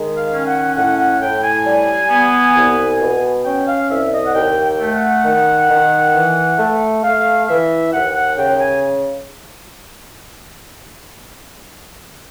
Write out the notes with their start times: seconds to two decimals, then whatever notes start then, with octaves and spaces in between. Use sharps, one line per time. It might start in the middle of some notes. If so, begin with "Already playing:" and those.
Already playing: D#3 G#3
0.17 F5
0.32 C#4
0.47 F#5
0.76 A2 F#5
0.99 F#5
1.21 A2 G5
1.43 G#5
1.65 G3
2.10 B3
2.55 C2
3.00 B2
3.45 C#4 G5
3.67 F5
3.89 C2 E5
4.13 D#5
4.26 F#5
4.34 D#2 G5
4.65 G5
4.79 A3
4.94 F#5
5.24 D#3
5.69 D#3
6.13 E3
6.58 A3
7.04 A3 F5
7.48 E3 E5
7.92 D#2 F#5
8.15 F#5
8.37 C#3 G5
8.60 G#5